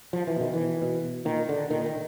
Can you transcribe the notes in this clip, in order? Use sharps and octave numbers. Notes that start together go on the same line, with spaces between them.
F3
E3
B2 D#3
E3
B2
A#2 D#3
D3
A#2 D#3
D#3